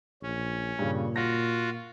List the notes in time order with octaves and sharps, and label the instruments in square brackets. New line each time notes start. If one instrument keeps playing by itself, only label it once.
[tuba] A#1 [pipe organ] C#4
[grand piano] G2 C#3 [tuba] A#2
[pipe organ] F4 F#4 [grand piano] A#6